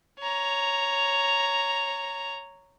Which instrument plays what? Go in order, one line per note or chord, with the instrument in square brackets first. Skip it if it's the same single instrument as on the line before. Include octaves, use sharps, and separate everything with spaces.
[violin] C#5 A#5